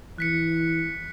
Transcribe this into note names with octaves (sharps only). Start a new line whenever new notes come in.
E3 F#6 B6 C#7